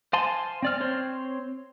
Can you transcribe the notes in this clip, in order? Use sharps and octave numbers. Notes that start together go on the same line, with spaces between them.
C5 F5 G#5 A5 C6
C4 D5 F6
C4 C5 C#5